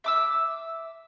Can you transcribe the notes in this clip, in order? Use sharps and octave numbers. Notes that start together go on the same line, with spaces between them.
E5 D6 E6